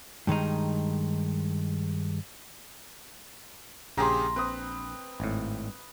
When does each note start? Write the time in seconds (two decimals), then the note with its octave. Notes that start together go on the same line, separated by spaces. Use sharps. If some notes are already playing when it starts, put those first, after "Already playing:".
0.27 G2 D#3 G#3 D#4
3.97 A#1 C#3 G4 G#4 A#5 C6
4.36 C4 B4 D#6
5.20 G#1 A2